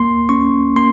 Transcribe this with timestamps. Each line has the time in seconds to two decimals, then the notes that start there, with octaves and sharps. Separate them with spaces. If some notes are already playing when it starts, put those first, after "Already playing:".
Already playing: A#3 C6
0.29 C#4 C#6
0.76 A#3 C6